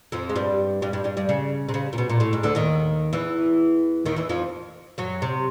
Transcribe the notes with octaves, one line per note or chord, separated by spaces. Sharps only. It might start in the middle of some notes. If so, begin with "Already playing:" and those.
F2 F3
G#3
G2 G3
G2 G3
G2 G3
G2 G3
G2 G3
C#3
C3
C#3
A#2
B2
A#2
A2
G#2
D2 D3
D#2 D#3
E2 E3
D#2 D#3
E2 E3
F2 F3
F#2 F#3
C3